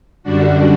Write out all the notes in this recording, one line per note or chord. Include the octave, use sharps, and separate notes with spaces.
F#2 D3 G3 D4 F#4